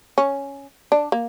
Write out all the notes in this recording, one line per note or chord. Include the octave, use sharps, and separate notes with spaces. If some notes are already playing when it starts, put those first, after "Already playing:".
C#4
D4
A#3